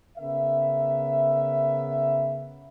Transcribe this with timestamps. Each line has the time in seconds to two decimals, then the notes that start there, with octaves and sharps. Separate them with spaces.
0.18 C#3 B3 A#4 E5